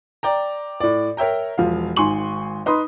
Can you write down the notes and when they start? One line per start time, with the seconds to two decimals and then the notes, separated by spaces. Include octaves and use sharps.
0.23 D5 G5 A#5
0.80 A2 D5
1.17 A#4 C#5 E5 G5 A#5
1.58 E1 F3 F5
1.97 G#1 G#2 G#5 C6 C#6 F#7
2.66 D#4 B4 B5 C6 D#6